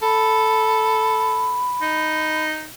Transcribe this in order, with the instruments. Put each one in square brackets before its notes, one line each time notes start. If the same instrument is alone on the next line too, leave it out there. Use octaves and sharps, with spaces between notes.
[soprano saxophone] A4 [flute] B5
[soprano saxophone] D#4